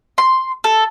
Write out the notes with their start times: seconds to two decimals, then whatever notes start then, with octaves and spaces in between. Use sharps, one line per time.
0.18 C6
0.64 A4